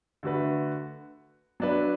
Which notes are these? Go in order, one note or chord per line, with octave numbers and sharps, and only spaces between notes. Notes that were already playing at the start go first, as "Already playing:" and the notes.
D3 A3 F#4 B4
F#3 D4 B4